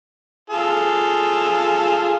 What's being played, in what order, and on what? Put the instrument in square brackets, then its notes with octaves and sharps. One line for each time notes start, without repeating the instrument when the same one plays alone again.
[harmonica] F4 G#4 A4